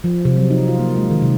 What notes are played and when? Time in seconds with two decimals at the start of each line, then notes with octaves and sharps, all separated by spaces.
0.04 F3
0.25 C3
0.37 F#3
0.50 D#4
0.68 F4
0.79 A#3
0.96 G#3
1.10 D#3
1.22 C3